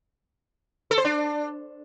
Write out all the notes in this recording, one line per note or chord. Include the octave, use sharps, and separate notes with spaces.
A4
C5
D4